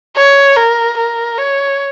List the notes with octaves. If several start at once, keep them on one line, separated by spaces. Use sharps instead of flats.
C#5
A#4
A#4
C#5